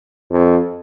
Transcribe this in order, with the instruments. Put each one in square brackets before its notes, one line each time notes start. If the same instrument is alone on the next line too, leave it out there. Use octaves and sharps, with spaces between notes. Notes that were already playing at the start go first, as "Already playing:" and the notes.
[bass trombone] F2